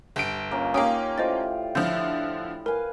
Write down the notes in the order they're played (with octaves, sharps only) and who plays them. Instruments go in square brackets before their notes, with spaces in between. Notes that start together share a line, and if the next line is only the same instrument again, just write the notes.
[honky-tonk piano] G1 D7
[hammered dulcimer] A#3 C#4 F4
[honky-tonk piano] A#3 C#4 [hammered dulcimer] D#4 F4 G4 [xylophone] F5 G5 D#6
[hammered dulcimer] A2 F4 D5 [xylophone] C5 D#5 A6
[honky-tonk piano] D3 F3 [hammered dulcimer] E4 [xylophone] G6
[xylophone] A#4 [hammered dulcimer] B4 F5 G#5